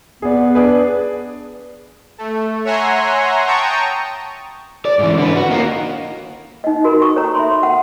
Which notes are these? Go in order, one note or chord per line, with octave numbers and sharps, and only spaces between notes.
B3 G#4 D5
D4 G#4 B4
A3
C#5 E5 F#5 G#5 A#5 C6
G5 A5 A#5 C#6 D#6
D5
G#2 E3
D3 B4
F#4
A#3 D#4
D#4 D#5
F#4 A#4 B5
C#6 D#6
A4 C#5 A#5
E5 B5 C6
F#5